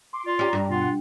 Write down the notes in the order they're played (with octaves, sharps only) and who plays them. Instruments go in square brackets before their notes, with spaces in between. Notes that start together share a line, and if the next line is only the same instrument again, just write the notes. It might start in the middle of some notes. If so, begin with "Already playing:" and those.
[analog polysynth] C6 D6
[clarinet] F4 [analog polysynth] D5
[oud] C#4 G4 [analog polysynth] D5 A#5
[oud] G2
[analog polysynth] B2 F#5 [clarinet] F4